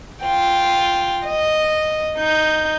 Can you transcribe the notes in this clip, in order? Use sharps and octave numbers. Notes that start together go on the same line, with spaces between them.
F4 G5
D#5
D#4 G6